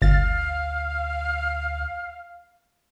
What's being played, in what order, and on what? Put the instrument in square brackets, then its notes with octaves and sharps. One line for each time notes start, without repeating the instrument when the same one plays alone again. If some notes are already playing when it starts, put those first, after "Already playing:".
[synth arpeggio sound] G1 A6 [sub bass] D2 [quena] F5